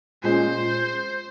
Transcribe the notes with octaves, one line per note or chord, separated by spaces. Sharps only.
A#2 G#3 C#4 C5